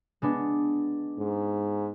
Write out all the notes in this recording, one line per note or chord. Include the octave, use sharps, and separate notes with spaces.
G#3 B3 D4
G#2